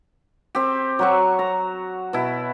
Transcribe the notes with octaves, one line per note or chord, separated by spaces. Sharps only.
C4 G4
F#3 F#4 C#6
A#5
B2 E4